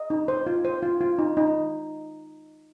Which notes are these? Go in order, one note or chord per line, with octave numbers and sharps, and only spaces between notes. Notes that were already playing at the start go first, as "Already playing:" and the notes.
Already playing: D#5
D#4
C5
F4
C5
F4
F4
D#4
D#4